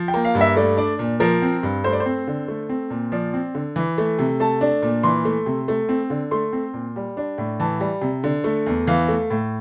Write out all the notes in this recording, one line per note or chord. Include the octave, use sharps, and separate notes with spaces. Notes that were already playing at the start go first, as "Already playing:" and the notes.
Already playing: F3
G5
A#3
F5
G2
E5
A3 D5
D4 D5
A#2
F3 A#4
C4
G2
A3 C5
D5
C5
C4
D3
A3
C4
A#2
F3 D5
C4
D3
E3
A3
C3
A3 A5
D4
A#2
E3 C6
A3
C3
A3
C4
D3
A3 C6
C4
A#2
G3
D4
A2
E3 A5
G3
C3
D3
A3
E2
E3 F5
A3
A2